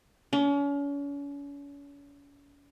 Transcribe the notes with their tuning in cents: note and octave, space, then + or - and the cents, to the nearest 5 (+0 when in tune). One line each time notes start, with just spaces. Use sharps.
C#4 +40